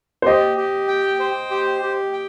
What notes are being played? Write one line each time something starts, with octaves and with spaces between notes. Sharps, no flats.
C5
G4 D#5
G4
G5
C5
G4
G4
G5